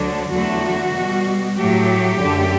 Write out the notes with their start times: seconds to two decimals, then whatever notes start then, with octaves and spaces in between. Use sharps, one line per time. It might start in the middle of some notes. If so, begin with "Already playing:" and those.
Already playing: D2 D3 F#3 D4
0.32 E2 D3 F#3 A3 F#4
0.96 B2 G3
1.58 A2 F#3 A3 G4
2.21 F#2 D3 A3